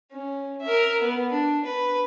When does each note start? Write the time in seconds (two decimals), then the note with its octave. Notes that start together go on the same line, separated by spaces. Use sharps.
0.12 C#4
0.61 A#4 E5
1.02 B3
1.31 D4
1.65 B4